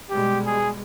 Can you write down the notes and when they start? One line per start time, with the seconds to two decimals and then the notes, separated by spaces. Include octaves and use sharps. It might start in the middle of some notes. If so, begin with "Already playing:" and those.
0.10 B2 G3 G#3 G4
0.46 G#4